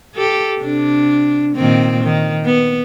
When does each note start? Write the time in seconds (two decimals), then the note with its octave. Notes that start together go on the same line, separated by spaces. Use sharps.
0.14 G4 A4
0.61 C3 D4
1.55 A#2 D#3 C4
2.04 D#3
2.45 B3